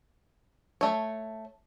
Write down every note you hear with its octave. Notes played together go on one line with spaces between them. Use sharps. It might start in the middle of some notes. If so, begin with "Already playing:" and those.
A3 C#5